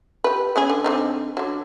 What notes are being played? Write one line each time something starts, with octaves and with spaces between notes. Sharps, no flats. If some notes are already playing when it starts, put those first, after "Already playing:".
G4 B4
B3 C#4 G#4
D3
D3 C4 D#4
D3 F#3